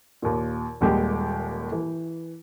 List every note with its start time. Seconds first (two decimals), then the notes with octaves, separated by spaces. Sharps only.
0.22 D#2 A#2
0.81 D#1 D#2 G3 G#3 G4
1.72 E3